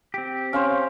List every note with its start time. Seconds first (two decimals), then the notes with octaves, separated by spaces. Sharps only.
0.14 C4 G4
0.53 C#4 C5 F5